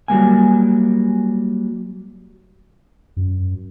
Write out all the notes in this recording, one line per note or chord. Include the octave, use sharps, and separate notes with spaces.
F#3 G3 A#3 G#5
F#2